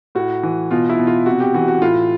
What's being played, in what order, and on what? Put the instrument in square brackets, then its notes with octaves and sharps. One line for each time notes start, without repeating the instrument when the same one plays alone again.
[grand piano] A2 F#4
E3
B2 F4
E4
B2
F4
C3 F#4
G4
E3 F#4
F#4
A2 F4